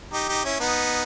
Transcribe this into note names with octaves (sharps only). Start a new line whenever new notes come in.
D#4 G4
D#4 G4
C#4 E4
B3 D#4